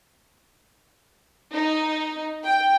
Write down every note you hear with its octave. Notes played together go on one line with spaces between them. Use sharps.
D#4
G5